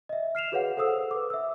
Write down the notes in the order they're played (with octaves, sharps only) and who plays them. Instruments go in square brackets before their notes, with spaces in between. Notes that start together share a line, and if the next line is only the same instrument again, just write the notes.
[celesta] D#5 E5
F6 C7 E7 F7
F#4 G#4 B4 C#5 F5 F#5
A4 C5 F#5 D#6 E6
B4 D6
E5 E6